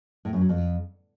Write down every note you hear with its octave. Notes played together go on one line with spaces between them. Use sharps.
A2
F#2
F#3
F2